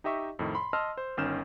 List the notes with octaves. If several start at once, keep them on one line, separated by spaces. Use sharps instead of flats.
D#4 G4 D#5 E5 C#6
F2 A2 D#3
B5 C6
D#5 A5 C6 E6 F6
C5
G1 D#3 C#4 F6 G6 E7